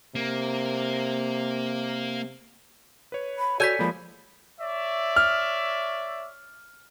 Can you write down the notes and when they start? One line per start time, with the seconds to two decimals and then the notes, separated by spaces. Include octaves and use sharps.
0.15 C3 A#3
3.12 B4 C#5
3.38 B5
3.60 F#4 A4 C#5 D5 G#5 G6 B6
3.79 F3 G#3 A#3 B5
4.60 C#5 D5 E5
5.16 F6